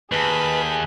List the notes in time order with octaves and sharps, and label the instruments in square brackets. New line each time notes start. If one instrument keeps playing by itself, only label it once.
[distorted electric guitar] D#2 [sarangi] G#4 [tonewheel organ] B4 [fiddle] A5 B5